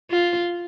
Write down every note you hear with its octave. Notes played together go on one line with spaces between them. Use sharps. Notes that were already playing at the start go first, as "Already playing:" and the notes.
F4